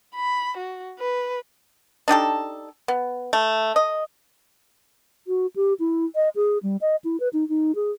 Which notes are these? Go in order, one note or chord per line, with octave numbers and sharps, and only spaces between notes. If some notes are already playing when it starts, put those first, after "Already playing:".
B5
F#4
B4
D4 D#4 G4 A4
B3
A3
D#5
F#4
G4
E4
D#5
G#4
G3
D#5
E4
B4
D#4
D#4
G#4